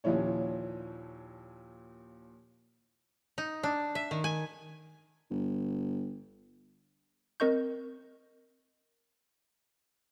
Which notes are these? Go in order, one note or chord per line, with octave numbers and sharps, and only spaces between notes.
D#2 A#2 F3 C#4 E4 C#5
D#4
D4
E5
D#3
G#5
G1
C4 A#4 D#5 C#6 G6